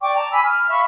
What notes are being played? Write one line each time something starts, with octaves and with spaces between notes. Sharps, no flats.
D5 G5 C#6 D6
A5 A#5
G#5 B5 D6 E6
F6
E5 F5 B5 C#6